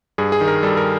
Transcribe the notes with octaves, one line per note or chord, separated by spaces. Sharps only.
G2 G#4
G#4
D#3
A#4
G3 A4
A#4